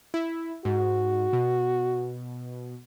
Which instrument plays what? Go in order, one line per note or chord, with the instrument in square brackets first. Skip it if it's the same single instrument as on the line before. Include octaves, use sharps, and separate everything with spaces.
[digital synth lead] E4
[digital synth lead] G#2 [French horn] F#4
[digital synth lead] B2